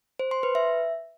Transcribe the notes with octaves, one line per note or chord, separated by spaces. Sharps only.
C5
C6
B4
E5